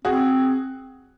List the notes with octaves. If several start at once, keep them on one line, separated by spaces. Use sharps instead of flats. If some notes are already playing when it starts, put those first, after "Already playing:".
C4 F#4 G#4